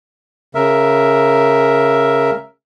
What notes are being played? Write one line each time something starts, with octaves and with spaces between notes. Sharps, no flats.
C#3 A#4 E5